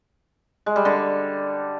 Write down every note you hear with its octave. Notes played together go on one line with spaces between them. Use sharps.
G#3
G3
D3